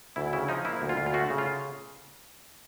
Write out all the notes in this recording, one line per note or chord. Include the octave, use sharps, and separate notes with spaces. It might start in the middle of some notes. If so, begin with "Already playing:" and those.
D2 E4
C#3 E4
F3 D#4
A#3 E4
D2
F4
D2
F4
A3 F#4
C#3
F4